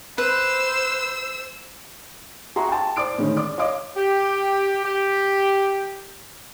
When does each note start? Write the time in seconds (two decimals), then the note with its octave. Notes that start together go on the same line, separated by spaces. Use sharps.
0.18 B4 C5 E6
2.56 F#4 G#4 E5 A#5 C6 C#6
2.69 G5 A5
2.96 C5 D5 D6 D7
3.18 A2 D3 D#3 G#3 C#4
3.37 D5 D6
3.58 C#5 D#5 F5 D6
3.96 G4
4.83 G4